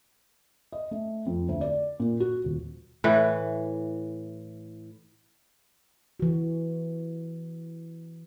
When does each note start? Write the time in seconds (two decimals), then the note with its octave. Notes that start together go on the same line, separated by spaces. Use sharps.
0.72 D#5
0.91 A3
1.26 F2
1.49 D2
1.61 D5
2.00 A#2
2.20 F#4
2.44 D#1
3.04 A2 E3
6.20 E3 F#4